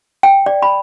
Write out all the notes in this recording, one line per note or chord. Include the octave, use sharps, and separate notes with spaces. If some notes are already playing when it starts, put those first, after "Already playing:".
G5
D5
B5